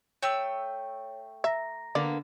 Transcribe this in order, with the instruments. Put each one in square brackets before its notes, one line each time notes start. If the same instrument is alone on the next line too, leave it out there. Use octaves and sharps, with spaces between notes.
[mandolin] A3 G5 E6 [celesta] C#5
[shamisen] E5 [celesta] A#5 A#6
[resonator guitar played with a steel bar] D3 A#3 B3 [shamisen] D5